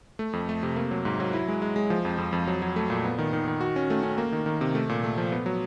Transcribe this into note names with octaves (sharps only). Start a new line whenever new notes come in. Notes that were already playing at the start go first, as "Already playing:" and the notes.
A3
F2
A3
C3
A#3
F#3
G#2
F#3
E4
G#3
G#3
G#3
F3
F2
F2
F2
F#3
F#3
A3
A#2
B3
D#3
D#3
D#3
F#4
C#4
A3
C#4
A#3
D#3
D#3
C3
A3
A#2
A3
F3
B3
F#3